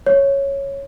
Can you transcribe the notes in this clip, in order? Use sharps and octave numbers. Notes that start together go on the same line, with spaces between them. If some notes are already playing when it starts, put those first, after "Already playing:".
C#5